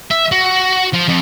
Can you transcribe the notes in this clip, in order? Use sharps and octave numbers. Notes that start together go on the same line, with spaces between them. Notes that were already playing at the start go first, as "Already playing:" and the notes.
E5
F#4
F3
F2